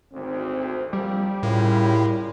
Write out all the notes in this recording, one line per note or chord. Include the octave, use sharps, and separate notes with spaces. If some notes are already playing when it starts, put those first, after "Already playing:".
G#1 D2 C4
A#1 G3
A2 C#3 E4 F4 A#4